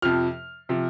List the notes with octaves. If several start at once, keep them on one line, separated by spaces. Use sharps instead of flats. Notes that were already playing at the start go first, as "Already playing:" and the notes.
F2 C3 F3 F6
C3 F3